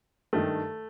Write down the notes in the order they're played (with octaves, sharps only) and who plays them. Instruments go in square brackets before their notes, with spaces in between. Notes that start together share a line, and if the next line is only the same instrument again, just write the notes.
[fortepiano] G2 D#3 A3